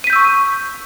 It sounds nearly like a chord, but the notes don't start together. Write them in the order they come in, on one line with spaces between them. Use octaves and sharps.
D#7 B6 G6 E6 C#6